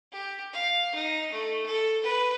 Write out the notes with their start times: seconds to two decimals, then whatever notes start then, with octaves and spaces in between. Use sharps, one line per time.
0.12 G4
0.53 F5
0.95 D#4
1.32 A3
1.66 A4
2.03 B4